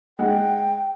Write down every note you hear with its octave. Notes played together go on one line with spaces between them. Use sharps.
G#3 F#5 G5 F#6